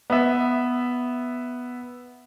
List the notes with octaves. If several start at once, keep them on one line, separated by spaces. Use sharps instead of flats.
B3 E5